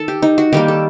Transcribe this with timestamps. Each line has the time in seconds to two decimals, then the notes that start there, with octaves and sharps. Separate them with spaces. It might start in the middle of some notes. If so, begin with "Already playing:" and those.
Already playing: D#3 A4
0.08 G4
0.22 D#4
0.38 F#4
0.53 D#3 G3 A#3 G4
0.68 A4